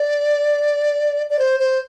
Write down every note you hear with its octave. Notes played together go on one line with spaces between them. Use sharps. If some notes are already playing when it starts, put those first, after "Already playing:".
Already playing: D5
D5
C5
C5